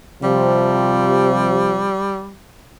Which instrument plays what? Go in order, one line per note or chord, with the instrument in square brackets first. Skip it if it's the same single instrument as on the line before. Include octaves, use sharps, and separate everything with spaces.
[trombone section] C3 F3 [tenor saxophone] G3